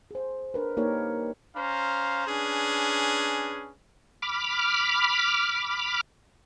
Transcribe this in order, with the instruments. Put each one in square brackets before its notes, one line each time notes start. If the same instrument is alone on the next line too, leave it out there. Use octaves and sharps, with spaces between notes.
[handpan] G#4 C5
D4 A#4 B4
A#3 D#4 G4 A#4 C#5
[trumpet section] C#4 C5 F5 A#5
C#4 D4 G#4 B4
[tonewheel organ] B5 D6 F6